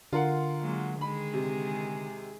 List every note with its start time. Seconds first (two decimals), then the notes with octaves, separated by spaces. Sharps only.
0.13 D3 F4 A#4 F#5
0.60 F#3 G#3 A#3
1.01 D#3 G#3 G#4 B5
1.34 C3